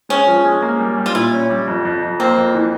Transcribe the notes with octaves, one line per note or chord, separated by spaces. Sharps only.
G#3 C#4
F3
G#3
A#3
G3
G3
F4
A#2 E4
C#4
G3
F2
F2
F2
A#3 C4
F2
E3